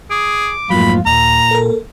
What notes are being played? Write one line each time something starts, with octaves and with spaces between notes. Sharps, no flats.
G#4 D6
F2 G#2 F#3 A3 A#3 F4 B5
D#2 A#2 A#5
A4 A#4